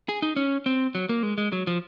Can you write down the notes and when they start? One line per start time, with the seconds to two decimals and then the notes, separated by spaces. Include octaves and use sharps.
0.09 G#4
0.22 D#4
0.36 C#4
0.66 C4
0.95 F#3
1.09 A#3
1.23 G#3
1.38 G#3
1.52 F#3
1.67 F3